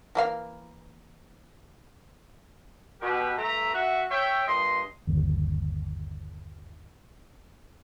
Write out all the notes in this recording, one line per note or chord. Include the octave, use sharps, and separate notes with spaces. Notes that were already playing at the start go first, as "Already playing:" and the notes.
E3 A#3 F5
B2 G4 B4
G2 A3 E5 A#5
F#4 E5
C#5 E5 G5
G2 A#2 D#5 C6
G1 D#2